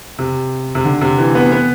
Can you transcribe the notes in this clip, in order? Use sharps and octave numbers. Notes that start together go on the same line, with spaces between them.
C3
C3
D3
C3
E3
B3
B3